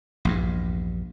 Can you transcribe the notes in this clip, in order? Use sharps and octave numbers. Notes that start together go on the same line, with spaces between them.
A#1 E2 G2